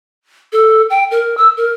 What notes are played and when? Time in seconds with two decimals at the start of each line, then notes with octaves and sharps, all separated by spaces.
0.53 A4
0.90 G5
1.11 A#4
1.38 E6
1.57 A#4